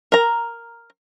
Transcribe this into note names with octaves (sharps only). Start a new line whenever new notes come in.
A#4 A#5